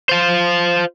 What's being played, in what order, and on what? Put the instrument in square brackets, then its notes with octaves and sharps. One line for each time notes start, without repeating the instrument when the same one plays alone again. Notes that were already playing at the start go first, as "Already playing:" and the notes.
[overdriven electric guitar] F4 C5